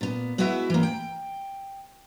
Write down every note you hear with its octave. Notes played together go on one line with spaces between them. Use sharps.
A#2 B3
G#3 B3 E4 F#4 B4 E5
E3 A#3
G5